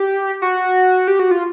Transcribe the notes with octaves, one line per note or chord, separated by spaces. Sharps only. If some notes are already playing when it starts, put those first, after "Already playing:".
Already playing: G4
F#4
G4
F#4
F4